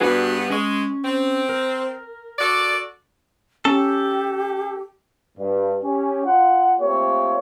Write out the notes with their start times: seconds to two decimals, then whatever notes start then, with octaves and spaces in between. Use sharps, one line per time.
0.01 G2 B3 D4 F#4 G#4
0.50 G#3 C#4 C#6
1.05 C4
1.49 A#4
2.39 F#4 A4 D5
3.65 C#4 G4 A4
5.38 G2
5.83 C#4 G4
6.25 F4 F#5
6.79 A3 A#3 C4 F4 G4 C#5